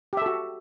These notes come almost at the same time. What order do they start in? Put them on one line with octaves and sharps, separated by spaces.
G4 E5 A4 F#4